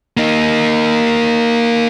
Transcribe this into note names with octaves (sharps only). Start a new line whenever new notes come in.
A#3 D#4